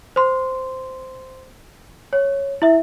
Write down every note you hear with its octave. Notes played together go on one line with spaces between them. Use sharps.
C5 C6
C#5
E4 E5